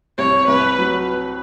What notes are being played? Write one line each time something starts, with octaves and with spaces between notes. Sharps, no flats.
C2 C#5
C2 B4
F#3